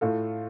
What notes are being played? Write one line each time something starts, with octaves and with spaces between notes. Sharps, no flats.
A2 A3 F4 A4